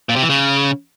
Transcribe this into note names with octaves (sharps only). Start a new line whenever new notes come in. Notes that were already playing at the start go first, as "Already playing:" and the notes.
A#2
C3
E3
C#3